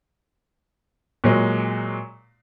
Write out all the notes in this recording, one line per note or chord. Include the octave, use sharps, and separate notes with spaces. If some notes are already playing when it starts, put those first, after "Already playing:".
A#2 F#3 G#3